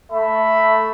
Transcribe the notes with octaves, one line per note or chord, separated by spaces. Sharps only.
A3 A4 E5 B5